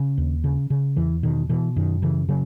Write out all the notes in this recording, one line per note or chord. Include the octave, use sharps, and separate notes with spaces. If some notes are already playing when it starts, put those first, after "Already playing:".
Already playing: C#3
D#2
C#3
C#3
E2 E3
B2 D#3
B2 E3
F#2 D#3
C#3 E3
C#3 F#3